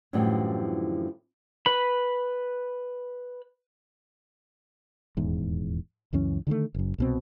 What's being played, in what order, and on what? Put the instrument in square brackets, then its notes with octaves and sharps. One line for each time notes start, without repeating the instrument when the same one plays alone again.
[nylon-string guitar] F#2 A2 D3 E3 F3 G3
[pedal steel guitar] B4 B5
[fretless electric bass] D#1 E2 G#2
C#2 F#2 E3 C#4
D3 D#3 G#3 A3
F#1 F#2
C2 B2 C4